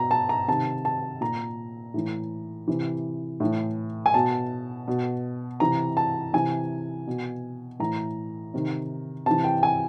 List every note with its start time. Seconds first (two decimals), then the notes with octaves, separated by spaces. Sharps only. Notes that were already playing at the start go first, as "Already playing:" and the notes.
Already playing: B2 A#5
0.11 A5
0.29 A#5
0.48 C3 D#3 A5
0.85 A5
1.21 A#2 A#5
1.94 A2 E3
2.68 C3 E3
3.40 A2 E3
4.06 G#5
4.14 B2 A5
4.88 B2
5.60 C3 E3 A#5
5.97 A5
6.33 C3 E3 G#5
7.07 B2
7.79 A2 E3 A#5
8.54 C3 D#3
9.26 C3 E3 A5
9.44 G5
9.63 G#5